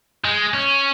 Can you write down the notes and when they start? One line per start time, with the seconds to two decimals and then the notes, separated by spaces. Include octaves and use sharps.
0.25 G#3
0.54 C#4